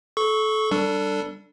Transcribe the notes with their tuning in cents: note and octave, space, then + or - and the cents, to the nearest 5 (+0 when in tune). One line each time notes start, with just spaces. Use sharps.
A4 -25 C#6 +0
G3 -20 D4 +0 A4 +25